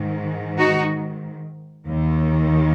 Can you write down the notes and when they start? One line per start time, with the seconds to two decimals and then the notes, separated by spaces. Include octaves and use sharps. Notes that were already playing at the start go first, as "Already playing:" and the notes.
Already playing: G#2 D#3
0.58 D#4 F#4
1.87 D#2 D#3